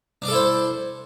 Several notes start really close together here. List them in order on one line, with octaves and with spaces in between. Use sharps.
D4 D5 A4 E4 C5